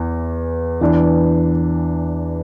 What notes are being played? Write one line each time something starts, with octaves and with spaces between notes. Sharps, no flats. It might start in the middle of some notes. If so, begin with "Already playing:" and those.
Already playing: E2 E3
E2 E3 D4